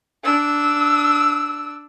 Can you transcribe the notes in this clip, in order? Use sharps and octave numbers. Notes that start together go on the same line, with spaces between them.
D4 E6